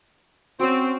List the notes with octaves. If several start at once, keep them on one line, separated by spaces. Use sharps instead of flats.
C4 C#4 F#4